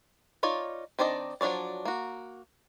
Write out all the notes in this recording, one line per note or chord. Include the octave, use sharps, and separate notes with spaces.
D#4 F4 C#5 D5
D#3 C4 D4 D5 D#5
F3 F#3 D4 C#5 D5
A#3 F#4